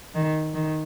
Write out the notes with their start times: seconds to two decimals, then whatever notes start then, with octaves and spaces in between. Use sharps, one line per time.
0.15 D#3
0.54 D#3